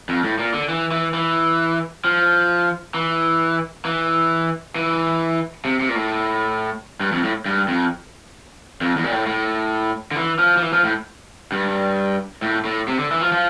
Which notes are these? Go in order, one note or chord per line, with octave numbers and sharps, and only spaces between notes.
F2
A2
A#2
D3
E3
E3
E3
F3
E3
E3
E3
C3
C3
A#2
A2
G2
F2
A2
G2
F2
F2
E2
A#2
A2
A2
D3
E3
F3
F3
E3
F3
A2
G2
A2
A2
C3
D3
E3
F3
F3